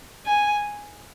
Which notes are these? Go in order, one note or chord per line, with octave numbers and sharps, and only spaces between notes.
G#5